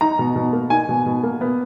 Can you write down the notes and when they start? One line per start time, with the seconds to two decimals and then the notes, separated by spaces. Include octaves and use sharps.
0.01 D#4 A#5
0.19 B2
0.36 B2
0.53 A#3
0.70 D#4 G#5
0.89 B2
1.06 B2
1.23 A#3
1.41 B3